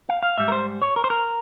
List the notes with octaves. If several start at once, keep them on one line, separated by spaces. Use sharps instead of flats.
F5
F5
G#2 G3 E5
A#4
C5
C#5
A#4
C5
A#4